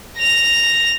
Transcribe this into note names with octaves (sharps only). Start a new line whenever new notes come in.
A#6 F7